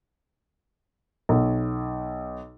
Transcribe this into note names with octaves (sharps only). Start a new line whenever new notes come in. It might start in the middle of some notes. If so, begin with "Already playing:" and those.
B1